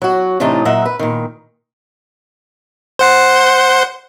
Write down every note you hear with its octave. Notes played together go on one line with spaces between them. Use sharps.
F#3 F#4
A2 C3 E3 A3 D4 D#4
A#2 F#3 D#5 E5 F#5
B4
A#2 D#3
C5 F#5 C6